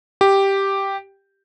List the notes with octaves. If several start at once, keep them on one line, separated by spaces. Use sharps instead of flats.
G4